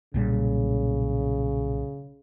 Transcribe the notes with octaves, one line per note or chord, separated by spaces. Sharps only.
B1 A#2 C#3 G3